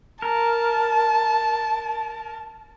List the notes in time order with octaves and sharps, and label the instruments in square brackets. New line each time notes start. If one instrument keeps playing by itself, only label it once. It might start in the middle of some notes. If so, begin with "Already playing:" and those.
[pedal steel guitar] A#4 [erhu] A5